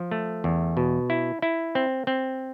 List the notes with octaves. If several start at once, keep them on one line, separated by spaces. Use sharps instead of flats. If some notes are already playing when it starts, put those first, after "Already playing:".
Already playing: F3
A3
E2
B2
E4
E4
C4
C4